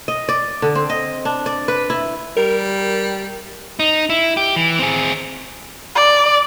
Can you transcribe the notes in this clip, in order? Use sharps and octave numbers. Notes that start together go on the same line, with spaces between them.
D#5
D5
D3
C4
D#5
D4
D5
B4
E4
G3 A#4
D#4
E4
G4
E3
C4 G#4
D5